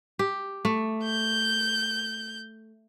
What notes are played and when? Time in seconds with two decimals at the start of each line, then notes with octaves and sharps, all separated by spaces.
0.19 G4
0.65 A3
1.04 G6